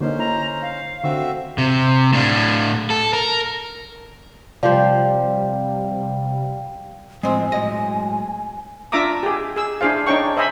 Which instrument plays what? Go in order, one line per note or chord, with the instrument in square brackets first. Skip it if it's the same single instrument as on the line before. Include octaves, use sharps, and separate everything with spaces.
[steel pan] D3 A#3 D#4 [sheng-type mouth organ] C#4 C5
[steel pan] E4 [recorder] A#5
[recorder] F5
[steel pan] D3 [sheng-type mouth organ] C4 F#4 E5
[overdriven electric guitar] C3
A2 D4
A4
A#4
[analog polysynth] C3 G3 [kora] F3 G4 C5 [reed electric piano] D5 [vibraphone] F5 G5
[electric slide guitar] A2 F3 [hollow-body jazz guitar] G#3 C4 [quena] G#5
[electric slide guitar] A2 F#3 G#3 [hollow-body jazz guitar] D#5
[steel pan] D4 F4 E5 A#5 D6 D#6
G4 G#4
G#4 E6
D4 E4 G#4 C5 F5
D4 D#4 C#5 G5 C#6
C5 D#5 E5 G#5 B5